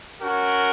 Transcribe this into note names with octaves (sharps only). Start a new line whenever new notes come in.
C#4 F#4 A#4